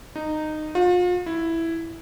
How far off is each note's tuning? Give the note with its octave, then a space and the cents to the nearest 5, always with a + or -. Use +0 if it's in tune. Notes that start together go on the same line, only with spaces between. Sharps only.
D#4 -15
F4 +40
E4 +0